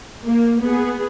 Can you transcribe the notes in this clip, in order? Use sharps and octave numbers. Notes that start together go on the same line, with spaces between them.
A#3
B3 G#4